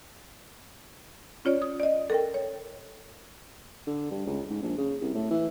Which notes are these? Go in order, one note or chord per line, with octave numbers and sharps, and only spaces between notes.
C#4 F4 C#5 D5
D#6
D5 D#5
A4 A#4 G5
C#5
D3
G2
C#2
G#2
A#1
C#3
C2
A2
E3